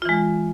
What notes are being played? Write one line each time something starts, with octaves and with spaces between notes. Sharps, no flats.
E3 G#3 F4